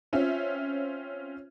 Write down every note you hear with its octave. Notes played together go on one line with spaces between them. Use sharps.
C4 C#4 F4 E5